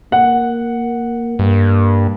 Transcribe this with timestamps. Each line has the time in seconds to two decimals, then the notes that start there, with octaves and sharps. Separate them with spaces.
0.12 A#3 F#5
1.39 G2 A#3